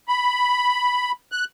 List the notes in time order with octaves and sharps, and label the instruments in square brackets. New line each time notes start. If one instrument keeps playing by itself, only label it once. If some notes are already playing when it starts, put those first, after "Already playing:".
[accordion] B5
F#6